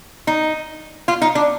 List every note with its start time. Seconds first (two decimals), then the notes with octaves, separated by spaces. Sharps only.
0.27 D#4
1.08 F4
1.22 D#4
1.35 D4